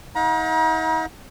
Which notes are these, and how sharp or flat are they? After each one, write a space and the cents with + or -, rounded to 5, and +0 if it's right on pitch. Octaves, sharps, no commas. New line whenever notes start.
D#4 +45 F#5 -45 A#5 +40